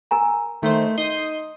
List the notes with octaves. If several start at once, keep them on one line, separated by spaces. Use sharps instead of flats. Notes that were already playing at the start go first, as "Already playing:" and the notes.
A#4 G#5 A#5
D#3 A3 C5
D#4 C6 D#6 G6